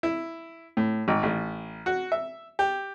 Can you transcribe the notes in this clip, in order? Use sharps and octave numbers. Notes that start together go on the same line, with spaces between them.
E4
A2
G#1
A1
F#4
E5
G4